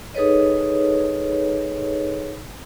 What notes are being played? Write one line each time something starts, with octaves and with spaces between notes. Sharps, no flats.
D#4 G#4 A4 B4 C#5 D#5